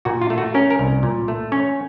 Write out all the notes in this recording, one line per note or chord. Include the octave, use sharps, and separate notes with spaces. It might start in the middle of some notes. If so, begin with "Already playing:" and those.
A#2 F#4
F4
A3
F#4
C#4 A#4
A#4
C2
A#2
A3
C#4 C#5